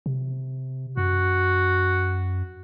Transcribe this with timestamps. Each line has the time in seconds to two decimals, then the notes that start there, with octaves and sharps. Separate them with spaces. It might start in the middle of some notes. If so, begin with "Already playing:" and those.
0.06 C3
0.97 F#2 F#4